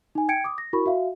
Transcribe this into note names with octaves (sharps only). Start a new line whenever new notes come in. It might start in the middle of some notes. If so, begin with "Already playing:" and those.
D#4 G#5
G5 G#6 C#7 D7
D6 D#6
A#6
E4 F#4 A#4 B5 C#6
F#4 E5 F5